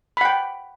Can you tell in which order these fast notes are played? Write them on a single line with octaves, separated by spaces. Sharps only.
B5 F#5 G5